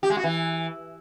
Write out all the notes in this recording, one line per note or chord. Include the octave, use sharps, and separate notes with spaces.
G4
G#3
F#4
E3